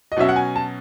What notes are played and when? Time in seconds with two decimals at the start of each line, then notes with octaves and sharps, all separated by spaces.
0.12 D#5
0.17 B2 F#3 C#4 E5
0.29 F#5
0.36 G#5
0.56 A5